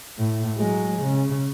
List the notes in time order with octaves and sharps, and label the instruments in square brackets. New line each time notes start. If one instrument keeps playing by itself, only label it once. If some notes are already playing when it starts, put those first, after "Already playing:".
[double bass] A2
F#3 G#3
C#3